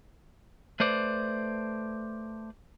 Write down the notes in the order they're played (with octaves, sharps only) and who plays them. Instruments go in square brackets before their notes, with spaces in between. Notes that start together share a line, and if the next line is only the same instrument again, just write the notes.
[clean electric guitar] A3 B4 C5 D5